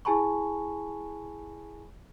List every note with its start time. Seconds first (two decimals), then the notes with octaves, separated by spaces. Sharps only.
0.05 E4 G#4 G#5 A5 B5 C#6